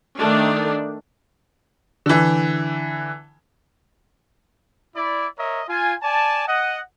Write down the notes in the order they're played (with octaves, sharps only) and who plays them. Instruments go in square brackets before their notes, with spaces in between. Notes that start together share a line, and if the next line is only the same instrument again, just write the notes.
[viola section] D#3 A3 D4
[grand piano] D3 E3
[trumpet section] E4 D5
A#4 C#5 D#5 E5
F4 G#5
D5 G#5 A5
D#5 F#5